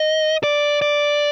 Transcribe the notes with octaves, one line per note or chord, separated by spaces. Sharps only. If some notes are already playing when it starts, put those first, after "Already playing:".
Already playing: D#5
D5
D5